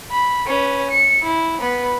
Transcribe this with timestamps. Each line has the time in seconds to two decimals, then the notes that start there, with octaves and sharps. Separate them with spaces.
0.12 B5
0.47 C#4 B4
0.91 C#7
1.23 E4
1.61 B3 B4